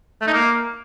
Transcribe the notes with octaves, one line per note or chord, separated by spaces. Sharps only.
A3
D#4
A#3